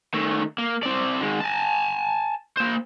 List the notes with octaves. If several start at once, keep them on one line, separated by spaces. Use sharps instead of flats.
D#3 A3
A#3
C4 D5
D#3 G#3
G#5 A5
A#3 C5